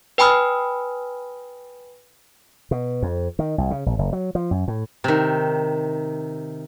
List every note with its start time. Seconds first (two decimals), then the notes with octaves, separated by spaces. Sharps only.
0.18 B4 G5 G#5 B5 D#6 F6
2.71 B2
3.03 F2
3.39 D#3
3.58 C2
3.71 C#3
3.86 A#1
3.99 F#1
4.13 F#3
4.35 F3
4.51 F#2
4.68 A2
5.04 C3 D#3